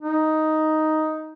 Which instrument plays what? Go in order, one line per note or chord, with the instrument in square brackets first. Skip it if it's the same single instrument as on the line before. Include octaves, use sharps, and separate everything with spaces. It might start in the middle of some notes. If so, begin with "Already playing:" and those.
[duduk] D#4